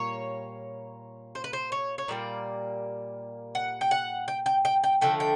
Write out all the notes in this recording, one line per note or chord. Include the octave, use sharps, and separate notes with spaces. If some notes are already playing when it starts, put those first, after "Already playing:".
Already playing: A#2 G3 A#3 C#5
C5
B4
C5
C#5
C#5
A#2 G3 A#3 D5
F#5
G5
F#5
G5
G5
G5
G5
D3 F3 A3 G5
G5